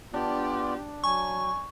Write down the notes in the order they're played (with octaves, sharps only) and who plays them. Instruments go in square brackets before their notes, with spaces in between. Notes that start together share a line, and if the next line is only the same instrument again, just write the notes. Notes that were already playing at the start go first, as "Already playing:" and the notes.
[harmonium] B3 F4 D5 [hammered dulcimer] D4 [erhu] G4
[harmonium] F#3 [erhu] G#5 [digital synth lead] C#6